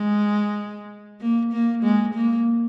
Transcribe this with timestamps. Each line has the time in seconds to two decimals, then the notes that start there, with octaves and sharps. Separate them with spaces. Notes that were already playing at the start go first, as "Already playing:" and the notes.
Already playing: G#3
1.21 A#3
1.53 A#3
1.83 G#3
2.14 A#3